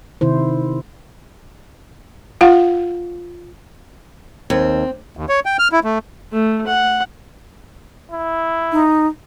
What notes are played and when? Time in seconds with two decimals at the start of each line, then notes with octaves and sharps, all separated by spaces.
0.21 C3 D#3 E4 C5
2.41 F4 F5 F#5
4.50 D#2 C4
5.17 D#2
5.29 C#5
5.46 G5
5.59 F6
5.72 E4
5.84 A3
6.32 A3
6.67 F#5
8.12 E4
8.72 D#4